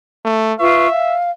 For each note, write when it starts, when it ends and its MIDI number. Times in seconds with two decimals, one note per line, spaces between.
0.25 0.53 57
0.59 0.87 65
0.59 0.87 71
0.59 1.17 76
0.59 0.87 85
0.90 1.30 77